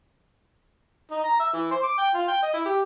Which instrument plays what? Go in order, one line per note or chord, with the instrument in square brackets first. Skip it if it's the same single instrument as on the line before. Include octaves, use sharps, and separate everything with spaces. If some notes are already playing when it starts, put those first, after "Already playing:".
[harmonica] D#4
A#5
E5
E3
C5
D6
G5
F4
G5
D#5
E4
G4